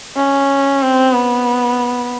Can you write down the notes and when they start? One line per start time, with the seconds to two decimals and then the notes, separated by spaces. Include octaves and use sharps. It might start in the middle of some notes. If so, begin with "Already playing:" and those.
0.17 C#4
0.82 C4
1.14 B3